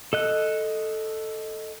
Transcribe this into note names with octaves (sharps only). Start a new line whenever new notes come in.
A4 D#5 F#6